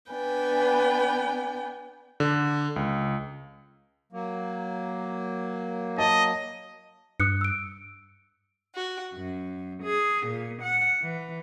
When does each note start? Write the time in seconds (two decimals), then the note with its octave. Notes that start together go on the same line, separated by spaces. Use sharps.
0.12 B3 D4 B4 G5 G#5
2.20 D3
2.76 C#2
4.12 F#3 A#3
5.98 D#5 A5
7.20 G2 D#6 F#6 C#7
7.41 E6 D7
8.73 F#4
9.14 F#2
9.82 G#4
10.25 A#2
10.62 F#5
11.01 E3